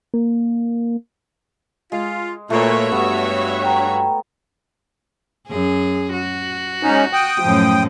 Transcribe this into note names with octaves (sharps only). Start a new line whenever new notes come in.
A#3
G#3 F4
A#2 A3 F#4 B4 C#5 E5
G2 B3
G5 A#5
F#2 G#4
F#4
G#2 C#4 D#4
G5 D#6
F#2 A2 F3